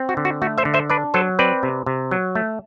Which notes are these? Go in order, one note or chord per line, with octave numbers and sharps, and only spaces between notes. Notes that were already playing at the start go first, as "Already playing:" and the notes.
Already playing: C4
F#4
D3
F#4
A3 F#4
C5 E5
D3
C5 E5
D4 B4 D5
F#3 A4 C5
C4 B4 D5
C3
C3
F#3
A3